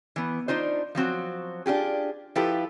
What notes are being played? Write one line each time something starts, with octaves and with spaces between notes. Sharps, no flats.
E3 B3
D4 D#4 F4 C5
F3 F#3 C4 F#4
D4 F4 G4 G#4
F3 E4 F4 G4 A4 B4